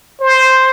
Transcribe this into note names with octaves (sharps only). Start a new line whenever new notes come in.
C5